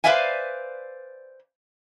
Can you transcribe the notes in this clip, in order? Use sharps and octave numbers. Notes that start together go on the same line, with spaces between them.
B4 C5 D5 E5 F5 G#5